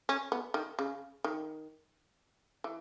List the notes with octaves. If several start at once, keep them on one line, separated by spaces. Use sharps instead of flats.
C#4
B3
D#3
C#3
D#3
E3